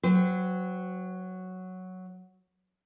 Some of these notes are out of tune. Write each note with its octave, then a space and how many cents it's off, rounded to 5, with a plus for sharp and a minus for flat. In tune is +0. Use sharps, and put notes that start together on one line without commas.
F#3 +0 C5 -40 G5 +0